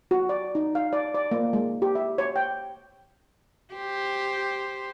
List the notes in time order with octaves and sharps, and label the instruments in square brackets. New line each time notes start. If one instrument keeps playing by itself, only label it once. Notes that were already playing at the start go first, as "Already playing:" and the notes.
[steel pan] F#4
D5
D#4
F5
D5
D5
A#3
G#3
G4
E5
C#5
G5
[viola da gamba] G4 C5